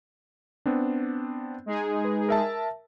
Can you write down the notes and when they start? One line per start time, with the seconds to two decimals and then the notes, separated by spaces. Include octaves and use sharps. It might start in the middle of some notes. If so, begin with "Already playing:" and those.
0.66 B3 C4 D4
1.66 G#3 D#4 G#4
2.05 B4
2.29 A#4 E5 A5